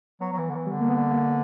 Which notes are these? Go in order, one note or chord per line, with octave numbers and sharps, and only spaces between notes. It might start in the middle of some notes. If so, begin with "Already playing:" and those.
F#3 B3
F#3
E3
D3
E3
G3
D3
A#3
B3
A#3